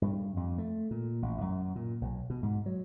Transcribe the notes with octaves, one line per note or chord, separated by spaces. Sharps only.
G2
F2
A3
A#2
A1
F#2
A#2
B1
B2
G#2
F#3